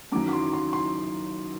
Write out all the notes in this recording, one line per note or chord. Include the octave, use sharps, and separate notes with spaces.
F#2 D#3 F#3 D6
D6
C6
C6
C6